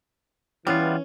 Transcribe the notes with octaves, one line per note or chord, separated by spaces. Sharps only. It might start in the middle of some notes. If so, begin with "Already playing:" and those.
E3 G3 B3 C#4 F4